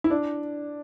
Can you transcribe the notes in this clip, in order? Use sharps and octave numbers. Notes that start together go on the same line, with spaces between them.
E4
D4